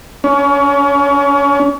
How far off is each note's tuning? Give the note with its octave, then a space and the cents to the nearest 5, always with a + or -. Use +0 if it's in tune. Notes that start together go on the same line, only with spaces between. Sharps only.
C#4 +30